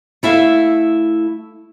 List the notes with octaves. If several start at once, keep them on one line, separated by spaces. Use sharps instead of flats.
A3 E4 E5 F5